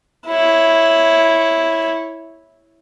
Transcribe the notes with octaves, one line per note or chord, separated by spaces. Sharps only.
E4 C#5